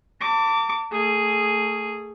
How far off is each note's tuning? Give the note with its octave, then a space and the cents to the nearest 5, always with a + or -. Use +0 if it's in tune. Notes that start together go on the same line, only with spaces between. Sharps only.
A5 +40 D6 -20
A3 +30 G#4 +0